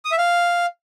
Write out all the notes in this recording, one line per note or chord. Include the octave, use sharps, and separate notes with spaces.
D#6
E5
F5